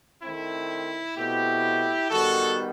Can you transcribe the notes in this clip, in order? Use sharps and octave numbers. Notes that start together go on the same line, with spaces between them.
D#3 A3 C4 E4
B2 A3 C4 E4 G4
D#3 G3 B3 F#4 A4